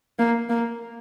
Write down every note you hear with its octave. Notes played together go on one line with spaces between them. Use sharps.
A#3
A#3